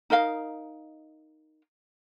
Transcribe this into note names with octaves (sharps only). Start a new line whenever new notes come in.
D#4 A#4 D#5 F5